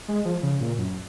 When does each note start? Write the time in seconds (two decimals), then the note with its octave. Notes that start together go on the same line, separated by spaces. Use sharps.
0.08 G#3
0.25 F3
0.43 C#3
0.61 A#2
0.78 F#2